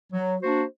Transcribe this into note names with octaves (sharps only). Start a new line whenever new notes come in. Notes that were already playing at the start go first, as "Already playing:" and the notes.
F#3
A#3 D4 F#4 C5